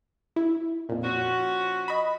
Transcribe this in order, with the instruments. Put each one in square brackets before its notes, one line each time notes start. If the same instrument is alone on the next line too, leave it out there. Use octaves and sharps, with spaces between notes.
[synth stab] E4
F2 A#2
[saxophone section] F3 C#4 F#4
[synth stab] D#5 B5